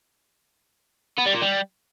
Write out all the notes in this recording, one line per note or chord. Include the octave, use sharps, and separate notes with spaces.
B3
G3
A#2
G3